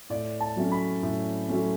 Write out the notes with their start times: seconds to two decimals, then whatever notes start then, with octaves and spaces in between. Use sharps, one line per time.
0.10 A2 D5
0.41 A5
0.56 F#3 A3 C#4
0.72 B5
1.03 A2
1.49 F#3 A3 C#4